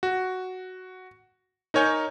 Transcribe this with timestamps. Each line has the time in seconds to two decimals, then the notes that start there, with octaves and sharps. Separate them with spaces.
0.03 F#4
1.74 D#4 A#4 C#5 G#5 G6